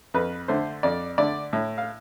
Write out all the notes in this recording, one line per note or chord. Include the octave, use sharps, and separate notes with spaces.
F2 B4
D3 A3 C5
F2 D5
D3 A3 D5
A2
F5